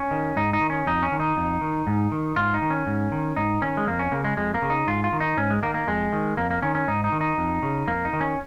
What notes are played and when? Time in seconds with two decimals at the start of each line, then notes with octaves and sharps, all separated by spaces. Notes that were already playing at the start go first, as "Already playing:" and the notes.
Already playing: C#4
0.11 D#3
0.36 G#2 D#4
0.53 D#4
0.61 D#3
0.70 C#4
0.86 F2 D#4
1.03 C#4
1.12 D#3
1.20 D#4
1.37 F2
1.61 D#3
1.87 G#2
2.12 D#3
2.36 G#2 F4
2.54 D#4
2.62 D#3
2.70 C#4
2.87 G#2
3.12 D#3
3.36 G#2 D#4
3.61 D#3 C#4
3.77 G#3
3.87 F2 A#3
3.99 C#4
4.12 C#3 A#3
4.24 G#3
4.37 F2 G#3
4.54 A#3
4.62 C#3
4.70 D#4
4.87 G#2 F4
5.04 F4
5.13 D#3
5.20 D#4
5.37 G#2 C#4
5.50 G#3
5.63 D#3 A#3
5.74 A#3
5.87 F2 G#3
6.13 D#3
6.37 F2 A#3
6.51 A#3
6.62 D#3 C#4
6.75 C#4
6.88 G#2 D#4
7.04 D#4
7.12 D#3
7.21 D#4
7.38 F2
7.63 C#3
7.87 F2 A#3
8.05 D#4
8.13 D#3
8.21 C#4